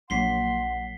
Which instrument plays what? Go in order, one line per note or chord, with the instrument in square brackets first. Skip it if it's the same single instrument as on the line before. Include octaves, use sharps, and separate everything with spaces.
[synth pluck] A#1 F#3 A#3 [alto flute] F#5 [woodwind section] C6 [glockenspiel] B6 C7 G7